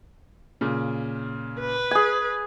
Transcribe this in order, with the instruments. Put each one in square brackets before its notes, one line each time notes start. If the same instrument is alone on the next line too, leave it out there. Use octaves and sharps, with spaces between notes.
[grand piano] A#2 C#3
[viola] B4
[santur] G#4 G#5